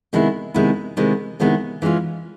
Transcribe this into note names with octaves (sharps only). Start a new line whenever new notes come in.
C3 D#3 G#3 B3 E4
C3 D#3 G#3 B3 E4
C3 D#3 G#3 B3 E4
C3 D#3 G#3 B3 E4
E3 G#3 C#4 F4